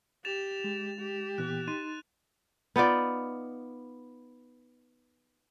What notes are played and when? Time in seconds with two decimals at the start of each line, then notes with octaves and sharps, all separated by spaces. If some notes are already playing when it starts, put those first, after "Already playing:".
0.25 G4 A6 E7 F7
0.64 G#3
0.99 G4
1.38 A#2 E3 B3 F#6
1.68 D#4 C6 A6 D#7
2.76 B3 D#4 F4 D5